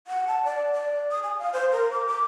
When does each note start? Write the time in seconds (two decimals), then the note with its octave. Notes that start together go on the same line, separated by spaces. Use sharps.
0.07 F#5
0.27 A5
0.44 D5
0.73 D5
1.11 D#6
1.23 G#5
1.39 F5
1.53 C5
1.72 A#4
1.92 D6
2.07 D6